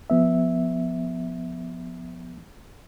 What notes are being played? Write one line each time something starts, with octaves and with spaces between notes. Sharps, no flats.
F3 B3 E5